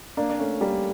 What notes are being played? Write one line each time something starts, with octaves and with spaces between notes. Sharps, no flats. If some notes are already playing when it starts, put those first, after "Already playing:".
A#3 D4
D4
A3 C#4
G3 A#3